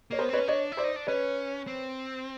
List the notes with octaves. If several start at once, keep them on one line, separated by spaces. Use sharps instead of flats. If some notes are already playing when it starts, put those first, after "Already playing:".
A#3 C#5
B3 A#4 C5
C4 B4 C#5
C#4
D4 C#5 D#5
E4
C5 D5
D#4
D4
C#4 B4 C#5
C4